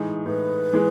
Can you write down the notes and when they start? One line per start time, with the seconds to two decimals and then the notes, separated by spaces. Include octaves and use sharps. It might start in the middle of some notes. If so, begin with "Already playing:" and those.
Already playing: A2 E3 G#3 D#4
0.26 A2 B4
0.73 E3 G#3